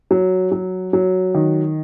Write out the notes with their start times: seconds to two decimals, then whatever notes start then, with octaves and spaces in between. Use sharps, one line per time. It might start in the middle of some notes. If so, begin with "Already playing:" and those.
0.11 F#3
0.52 F#3
0.93 F#3
1.34 D#3